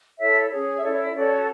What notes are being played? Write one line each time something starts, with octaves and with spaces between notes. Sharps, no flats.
E4 A4 C#5 E5
C#4 G#4 C#5
E5
C#4 E4 A4 C#5 D5
C#5
D5
C#4 F#4 A4 C#5 D5